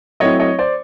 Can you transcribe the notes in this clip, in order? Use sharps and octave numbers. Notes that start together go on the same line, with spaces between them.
F#3 A3 C4 E4 C#5 D#5
C#5 D#5
C5 D5